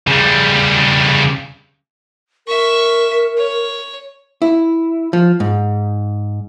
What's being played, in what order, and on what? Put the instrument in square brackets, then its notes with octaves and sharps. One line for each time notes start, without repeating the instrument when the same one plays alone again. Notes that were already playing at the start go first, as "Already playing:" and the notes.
[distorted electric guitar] C#3 G3
[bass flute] A#4 [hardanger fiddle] E5 C#6
[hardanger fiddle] C#5
[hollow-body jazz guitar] E4
F3
G#2